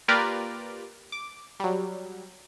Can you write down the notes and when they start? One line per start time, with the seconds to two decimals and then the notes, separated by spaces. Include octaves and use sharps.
0.08 A#3 F4 G4 A#4 B4 D5
1.12 D6
1.60 F#3 G3